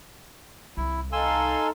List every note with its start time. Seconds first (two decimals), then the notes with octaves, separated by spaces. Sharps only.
0.77 C2 E4
1.12 D#4 A4 F5 G#5 C6 E6